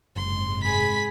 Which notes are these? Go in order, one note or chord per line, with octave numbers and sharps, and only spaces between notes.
F#1 G#2 C3 G#3 C6
G#4 B5 B6